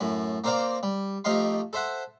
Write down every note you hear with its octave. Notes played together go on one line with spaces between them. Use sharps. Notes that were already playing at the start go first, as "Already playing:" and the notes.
F#2 A2
A#3 C4 A#4 C5 D5 F5
G3
F2 A3 D#4 G4 F5 C6
A4 C5 E5 F#5